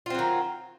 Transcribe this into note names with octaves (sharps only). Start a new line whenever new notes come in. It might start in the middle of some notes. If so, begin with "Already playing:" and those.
D#3 F#3 C4 F4